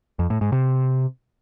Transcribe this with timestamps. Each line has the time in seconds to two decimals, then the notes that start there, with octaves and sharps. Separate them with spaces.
0.19 F2
0.30 A2
0.41 G#2
0.52 C3